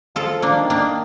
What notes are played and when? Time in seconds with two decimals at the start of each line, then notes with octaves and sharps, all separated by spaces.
0.16 F3 F4 A4
0.42 A#3 D4
0.57 D#3
0.70 A#3 D4